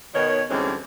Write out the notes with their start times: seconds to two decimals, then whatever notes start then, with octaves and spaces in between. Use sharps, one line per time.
0.15 B2 D#3 C#5
0.50 D2 G2 E3 G#3 C4 C#4